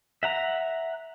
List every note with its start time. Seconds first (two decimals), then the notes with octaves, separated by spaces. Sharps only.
0.23 E5 F#5 A#5